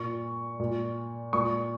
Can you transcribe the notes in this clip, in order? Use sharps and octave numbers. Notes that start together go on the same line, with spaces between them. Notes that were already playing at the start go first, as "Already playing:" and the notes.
Already playing: A#2 C#6
A#2
A#2 C#6